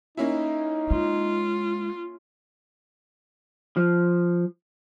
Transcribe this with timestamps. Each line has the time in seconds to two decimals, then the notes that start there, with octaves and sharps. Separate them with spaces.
0.17 A#3 C#4 D#4 E4
0.91 G#3 F4
3.77 F3